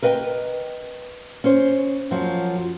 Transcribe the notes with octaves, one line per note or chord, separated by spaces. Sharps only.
A#4 B4 D#5 F#5 G5
C#4 C5
F#2 F3 F#4